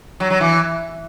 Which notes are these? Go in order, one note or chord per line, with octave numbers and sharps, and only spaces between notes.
F#3
F#3
E3